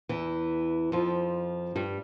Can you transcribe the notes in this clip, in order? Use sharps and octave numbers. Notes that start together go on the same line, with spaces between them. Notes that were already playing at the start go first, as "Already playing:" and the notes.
E2 E3
F2 F3
G2 G3